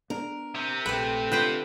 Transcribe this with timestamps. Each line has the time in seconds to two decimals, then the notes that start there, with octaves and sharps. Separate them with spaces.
0.10 B3 D4 A#4
0.55 C3 C4
0.86 A#1 A3 G4 B4
1.32 D3 F4 B4 C5 G5